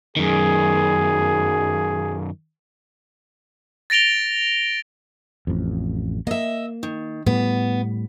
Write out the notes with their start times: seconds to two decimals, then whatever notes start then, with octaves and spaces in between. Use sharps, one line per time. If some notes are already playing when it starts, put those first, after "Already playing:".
0.17 F#2 D#3 G#4
3.90 A6 A#6 D7 F7 G7
5.47 A1 F2
6.27 A#3 D#5 E5
6.83 D#3
7.26 A2 G3 B3